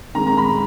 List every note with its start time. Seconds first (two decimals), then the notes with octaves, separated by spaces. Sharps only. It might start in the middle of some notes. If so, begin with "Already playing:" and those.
0.15 D#3 G#3 C4 A#5
0.27 A#5
0.37 B5